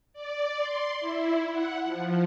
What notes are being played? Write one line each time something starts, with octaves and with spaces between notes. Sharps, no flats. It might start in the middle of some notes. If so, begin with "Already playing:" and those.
D5
C6
E4
F#5
F3